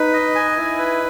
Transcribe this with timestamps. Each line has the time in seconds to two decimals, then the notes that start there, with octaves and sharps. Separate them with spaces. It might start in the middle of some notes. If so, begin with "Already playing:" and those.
Already playing: D#4 B4
0.14 D#5
0.35 G#5
0.57 E4
0.78 B4